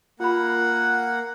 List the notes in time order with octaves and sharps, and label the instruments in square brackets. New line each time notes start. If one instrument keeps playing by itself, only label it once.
[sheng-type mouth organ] A#3 F#5 [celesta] F4 B5